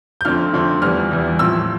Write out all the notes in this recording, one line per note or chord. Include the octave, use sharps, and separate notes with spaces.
G6
F2 D3 A3 C4 F6
F2 D3 A3 C4
E2 E3 G3 F6
E2 E3 G3
A2 F3 C4 E6